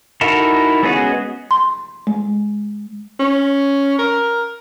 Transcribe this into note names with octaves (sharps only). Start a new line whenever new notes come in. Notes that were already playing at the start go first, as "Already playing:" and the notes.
D#4 E4 F#4 A4 A#4
G#3 B3 C#4 F#4 G#4
C6
G#3
C#4
A#4